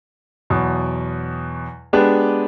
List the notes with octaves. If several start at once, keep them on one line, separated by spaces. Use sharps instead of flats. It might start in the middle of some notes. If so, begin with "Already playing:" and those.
E2 B2 F#3
G#3 B3 D4 G4 B4